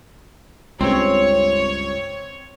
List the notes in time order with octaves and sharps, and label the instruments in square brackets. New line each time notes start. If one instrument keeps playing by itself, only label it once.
[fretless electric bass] C#2 G2 C#3 [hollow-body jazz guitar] C4 [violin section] C#5